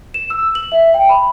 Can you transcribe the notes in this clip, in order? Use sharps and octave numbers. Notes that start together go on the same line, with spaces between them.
E7
E6
F#7
E5
G5
B5